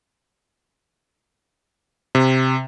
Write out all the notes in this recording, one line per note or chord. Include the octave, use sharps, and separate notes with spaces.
C3